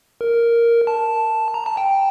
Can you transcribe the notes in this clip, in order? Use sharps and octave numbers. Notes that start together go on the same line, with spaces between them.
A#4
A5
A#5
A5
G5